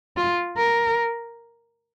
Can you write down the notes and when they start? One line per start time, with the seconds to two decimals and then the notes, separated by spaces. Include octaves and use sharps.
0.17 F4
0.57 A#4